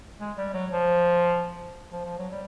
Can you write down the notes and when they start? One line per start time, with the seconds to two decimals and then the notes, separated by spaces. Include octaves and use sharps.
0.20 G#3
0.37 G3
0.54 F#3
0.72 F3
1.92 F3
2.05 F3
2.19 F#3
2.32 G3